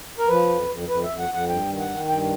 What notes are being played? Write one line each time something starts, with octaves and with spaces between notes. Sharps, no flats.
A#4
F3 B4
F2
F2
F2 B4
E5
F2
F#5
F2 F#5
G2 G5
D#3
F#5
D#3
G2 G5